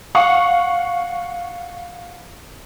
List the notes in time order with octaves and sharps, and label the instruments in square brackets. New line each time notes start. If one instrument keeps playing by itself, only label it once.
[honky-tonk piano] F5 F#5 C#6